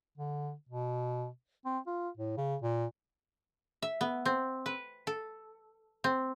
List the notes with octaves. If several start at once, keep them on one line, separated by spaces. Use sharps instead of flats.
D3
B2
C4
F4
A2
C#3
A#2
E5
B3
C4
B4
A4
C4